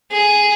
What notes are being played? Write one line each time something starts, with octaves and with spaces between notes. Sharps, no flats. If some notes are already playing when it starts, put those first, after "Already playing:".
G#4